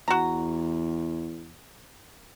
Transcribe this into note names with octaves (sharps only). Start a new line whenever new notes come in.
E2 F#4 A#5